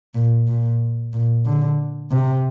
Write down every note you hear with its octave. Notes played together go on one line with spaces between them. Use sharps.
A#2
A#2
A#2
D3
C3